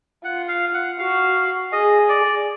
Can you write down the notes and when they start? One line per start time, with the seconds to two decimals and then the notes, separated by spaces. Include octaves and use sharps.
0.24 F4 F#5
0.48 F5
0.74 F#5
0.98 F#4 F5
1.72 G#4 D#5
2.09 D5